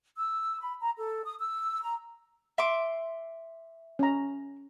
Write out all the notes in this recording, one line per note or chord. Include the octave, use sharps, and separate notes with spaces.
E6
B5
A#5
A4
D#6
E6
A#5
E5 C6 D6
C#4 A#5